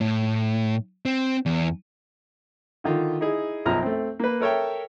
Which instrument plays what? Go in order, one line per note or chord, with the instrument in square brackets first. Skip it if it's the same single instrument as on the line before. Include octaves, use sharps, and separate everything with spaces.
[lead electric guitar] A2
C4
E2
[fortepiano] D3 D#3 F4
D#4 E4 G#4
B1 F#2 F3 A#5 F6
A3 C4
A#3 B4
A4 A#4 C#5 E5 G5